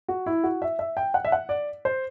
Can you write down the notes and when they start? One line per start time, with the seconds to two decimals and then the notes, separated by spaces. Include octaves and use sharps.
0.08 F#4
0.26 E4
0.44 F#4
0.62 E5
0.79 E5
0.97 G5
1.14 F#5
1.25 E5
1.32 F#5
1.49 D5
1.85 C5